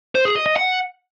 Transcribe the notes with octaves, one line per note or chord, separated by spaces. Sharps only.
C5
G#4
D#5
D#5
F#5